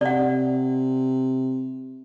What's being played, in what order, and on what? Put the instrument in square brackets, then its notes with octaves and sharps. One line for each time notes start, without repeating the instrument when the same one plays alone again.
[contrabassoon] C3 [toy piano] D5 F#5